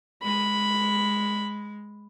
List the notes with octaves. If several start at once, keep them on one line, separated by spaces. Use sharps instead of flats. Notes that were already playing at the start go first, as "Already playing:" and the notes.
G#3 B5